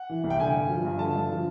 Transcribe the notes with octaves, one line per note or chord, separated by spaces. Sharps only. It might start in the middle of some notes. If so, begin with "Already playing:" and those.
Already playing: F#5
E3
C2
G5
D3 G#5
G2
F3
G2
D3 A5
G2
F3